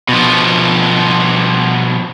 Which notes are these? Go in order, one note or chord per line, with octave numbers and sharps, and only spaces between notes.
B2 F3